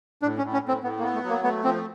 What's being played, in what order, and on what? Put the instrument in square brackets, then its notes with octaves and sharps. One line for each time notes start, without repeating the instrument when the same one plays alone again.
[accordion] A2 [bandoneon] D4
[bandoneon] C#4
[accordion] A2
[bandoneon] C#4
[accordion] A2 [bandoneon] C4
[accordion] A2 [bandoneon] B3
[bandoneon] A#3
[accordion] B3
[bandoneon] A3
[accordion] F#3
[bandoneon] A#3
[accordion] A3 [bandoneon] B3
[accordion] F3 [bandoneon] C4